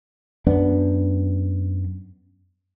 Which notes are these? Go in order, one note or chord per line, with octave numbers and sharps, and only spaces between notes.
F#2 B3 D4